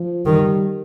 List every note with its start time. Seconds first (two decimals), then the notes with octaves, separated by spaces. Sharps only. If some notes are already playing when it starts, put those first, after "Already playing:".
Already playing: F3
0.26 D#3 G3